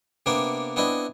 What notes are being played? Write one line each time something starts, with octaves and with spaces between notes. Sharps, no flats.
C3 A#3 B3 D4 D5
B3 C4 D4 E4 D#5